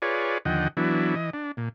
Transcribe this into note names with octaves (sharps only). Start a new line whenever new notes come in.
F4 G#4 B4 C#5 D5
D#2 D3 F3 D#5 F#5 G5
E3 F#3 B3 D4 E4
E3 D#5
D4
A#2